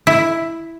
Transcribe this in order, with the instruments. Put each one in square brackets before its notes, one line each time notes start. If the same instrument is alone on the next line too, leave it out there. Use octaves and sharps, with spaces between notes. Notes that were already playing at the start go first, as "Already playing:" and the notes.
[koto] E4